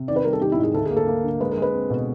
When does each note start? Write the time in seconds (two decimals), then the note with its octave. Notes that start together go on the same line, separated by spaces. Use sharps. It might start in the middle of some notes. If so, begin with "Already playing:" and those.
Already playing: C3
0.08 D#3 D5
0.16 B4
0.24 G3 A#4
0.33 A4
0.41 D#3 G4
0.52 E4
0.58 G#2
0.63 G#4
0.74 D2 A4
0.85 G#4
0.90 A#3
0.97 A4
1.07 A#3
1.24 D3
1.40 G#3 B4
1.51 A#4
1.57 G#3 B4
1.73 C4
1.90 B2